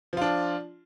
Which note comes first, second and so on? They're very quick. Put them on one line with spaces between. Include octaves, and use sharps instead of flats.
F3 F4 D4